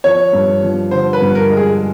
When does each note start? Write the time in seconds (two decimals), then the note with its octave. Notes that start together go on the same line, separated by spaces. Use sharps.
0.04 F3 C#5
0.33 G2
0.63 F3
0.91 D3 C5
1.13 B4
1.21 G2
1.35 A#4
1.50 G#3
1.57 G#4